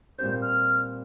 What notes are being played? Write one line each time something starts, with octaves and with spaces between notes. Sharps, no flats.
A#2 G3 C4 G4 C5 G6
F6